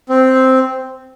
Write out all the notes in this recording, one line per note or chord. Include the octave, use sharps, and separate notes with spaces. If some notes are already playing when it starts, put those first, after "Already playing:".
C4